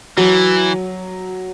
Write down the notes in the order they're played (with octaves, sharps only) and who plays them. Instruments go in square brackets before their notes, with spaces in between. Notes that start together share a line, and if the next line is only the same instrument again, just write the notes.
[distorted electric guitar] E3 [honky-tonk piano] F#3